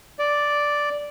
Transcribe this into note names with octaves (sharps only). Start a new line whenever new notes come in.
D5